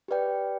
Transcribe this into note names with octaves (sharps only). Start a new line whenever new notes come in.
G4 B4 D5 G5